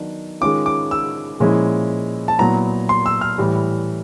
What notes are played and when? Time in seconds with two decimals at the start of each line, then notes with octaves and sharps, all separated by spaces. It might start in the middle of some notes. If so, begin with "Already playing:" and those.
Already playing: D#3 F#3 B3 D4
0.41 D#3 G#3 C#4 F4 D6
0.66 D6
0.91 E6
1.40 A#2 F3 G#3 C#4 E4
2.28 A5
2.39 A#2 F#3 B3 E4 A#5
2.89 C6
3.06 E6
3.21 F6
3.38 A2 E3 G3